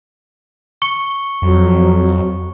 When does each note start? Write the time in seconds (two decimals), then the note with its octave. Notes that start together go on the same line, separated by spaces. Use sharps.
0.82 C#6 C#7 G7
1.42 F2 F#3